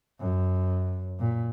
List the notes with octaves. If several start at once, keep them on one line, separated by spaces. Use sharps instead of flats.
F#2
A#2